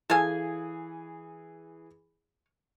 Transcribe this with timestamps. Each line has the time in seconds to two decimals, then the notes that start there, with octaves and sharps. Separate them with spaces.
0.10 E3 G#4 A4 F5 G#5